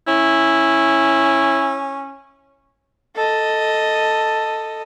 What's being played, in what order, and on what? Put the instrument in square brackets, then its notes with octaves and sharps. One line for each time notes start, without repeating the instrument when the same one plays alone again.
[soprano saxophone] C#4 [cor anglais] E4
[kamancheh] A4 D#5